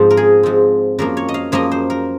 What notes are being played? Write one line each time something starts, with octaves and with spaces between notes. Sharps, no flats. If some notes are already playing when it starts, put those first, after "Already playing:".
Already playing: G#2 F3 C4
A#4
G#4
G#2 F3 C4
F#2 F3 A#3 A#4
C#5
D#5
F5
F#2 F3 A#3 D#5
C5
A#4